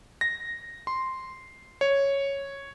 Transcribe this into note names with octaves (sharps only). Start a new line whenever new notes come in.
A#6
C6
C#5